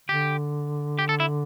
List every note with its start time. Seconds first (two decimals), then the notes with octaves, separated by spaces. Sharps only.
0.09 D3 G4
0.99 G4
1.09 A4
1.20 E4